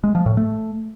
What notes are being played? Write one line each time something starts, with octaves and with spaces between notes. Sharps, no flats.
G#3
F3
A2
A3